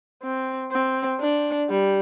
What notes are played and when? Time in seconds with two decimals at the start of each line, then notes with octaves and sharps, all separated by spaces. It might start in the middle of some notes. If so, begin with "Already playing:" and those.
0.23 C4
0.72 C4
1.21 D4
1.70 G3